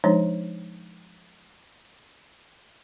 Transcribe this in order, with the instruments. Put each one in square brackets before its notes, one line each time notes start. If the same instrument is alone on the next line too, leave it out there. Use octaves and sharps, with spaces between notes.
[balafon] F3 G#3 D4 D#4 C#5